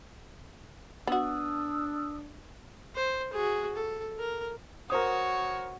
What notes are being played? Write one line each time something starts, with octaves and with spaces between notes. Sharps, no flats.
B3 D4 F#4 D#6 E6
C5
F#4 G#4
A4
A#4
F#4 A#4 C5 C#5 D#6